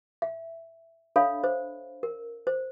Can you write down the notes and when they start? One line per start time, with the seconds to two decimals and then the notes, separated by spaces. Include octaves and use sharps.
0.22 E5
1.16 D4 A4 C#5 E5 F5 B5
1.44 C5
2.03 A#4
2.47 C5